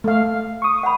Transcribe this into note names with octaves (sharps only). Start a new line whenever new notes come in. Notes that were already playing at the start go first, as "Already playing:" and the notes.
A3 F5
C#6 D#6
F#5 B5